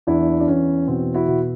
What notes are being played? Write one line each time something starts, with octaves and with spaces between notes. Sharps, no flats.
E2 D4 E4
D4
E2 C#4
B2 C4
E4 F#4
B2